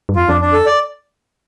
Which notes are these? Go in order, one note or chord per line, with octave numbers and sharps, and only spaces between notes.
G2
F2 F4
F2 D4
D4
A4
D5